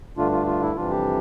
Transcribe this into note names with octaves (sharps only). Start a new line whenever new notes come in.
G2 D3 A3 D4 F4
F4
F4
E4
F2 C3 E3 G3 D4 F4
G4